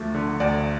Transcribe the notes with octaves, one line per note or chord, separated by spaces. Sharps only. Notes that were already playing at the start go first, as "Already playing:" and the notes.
Already playing: D2 F3 A3
D3
D2 D5